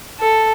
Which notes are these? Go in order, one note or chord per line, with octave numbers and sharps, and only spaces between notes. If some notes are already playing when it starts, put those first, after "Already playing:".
A4